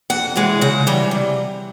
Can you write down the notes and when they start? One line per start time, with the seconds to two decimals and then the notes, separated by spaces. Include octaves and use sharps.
0.10 F2 F#5
0.36 C#3 E3 G#3
0.61 C#3 F#5
0.87 E3 G3
1.11 C3